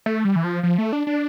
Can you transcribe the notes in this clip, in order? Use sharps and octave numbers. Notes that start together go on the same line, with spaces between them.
A3
G3
E3
F3
F3
A3
D4
D4